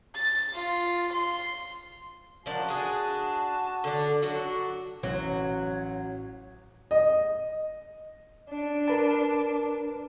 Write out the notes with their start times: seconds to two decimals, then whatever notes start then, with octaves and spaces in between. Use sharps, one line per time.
0.15 A6
0.55 F4
1.12 C6
2.46 F3 D4 F#4 A#4 A5
2.68 D4 G#4
3.84 D3 D4
4.22 F#3 D4 F#4
5.03 A1 F#3 C#5
6.91 D#5
8.50 D4
8.88 A#4 B4 A5